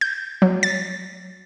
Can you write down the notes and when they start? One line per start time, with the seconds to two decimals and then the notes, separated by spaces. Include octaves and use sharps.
0.01 G6
0.42 F#3
0.63 A6